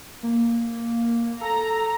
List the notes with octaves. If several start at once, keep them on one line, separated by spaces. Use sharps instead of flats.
A#3
A4 A#5